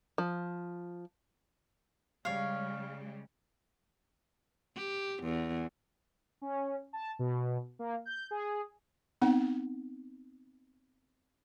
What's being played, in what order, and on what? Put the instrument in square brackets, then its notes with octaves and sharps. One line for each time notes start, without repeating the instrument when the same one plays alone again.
[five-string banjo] F3
[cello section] C#3 G3 G#3 [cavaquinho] C#5 F5
[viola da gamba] G4
E2
[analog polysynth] C#4
A5
B2
A#3
G6
G#4
[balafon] B3 C4 D#4 F#5